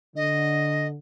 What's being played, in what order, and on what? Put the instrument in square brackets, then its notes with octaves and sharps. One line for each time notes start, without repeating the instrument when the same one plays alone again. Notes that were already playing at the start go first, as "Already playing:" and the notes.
[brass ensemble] D3 [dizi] D#5